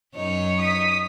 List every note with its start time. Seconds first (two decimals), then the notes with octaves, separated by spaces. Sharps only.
0.15 F#2 D#4 C#5
0.59 D#6 B6